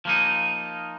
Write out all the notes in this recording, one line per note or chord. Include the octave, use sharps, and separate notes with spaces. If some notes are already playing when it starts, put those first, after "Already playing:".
F3 A#3 D#4